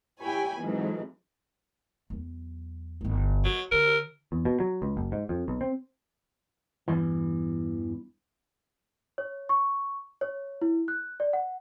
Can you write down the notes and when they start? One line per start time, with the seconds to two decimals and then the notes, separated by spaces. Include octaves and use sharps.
0.20 E4 G4 C#5 G5 G#5 B5
0.61 F2 G#2 E3 F#3
2.10 E2 F#3
3.01 G1 E4
3.44 F#3
3.72 D3 A#4
4.32 E2
4.45 B2
4.60 F#3
4.82 C#2
4.97 F#1
5.12 G#2
5.29 F2
5.48 B1
5.61 C4
6.88 E2 G2 E3
9.18 C#5
9.49 C#6
10.21 C#5
10.62 E4
10.88 F#6
11.20 D5
11.33 F#5